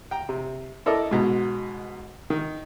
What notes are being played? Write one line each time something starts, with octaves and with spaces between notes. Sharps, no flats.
G5 A#5
C3
E4 A4 A#4 D5 D#5
G#2 B2 A#5
D#3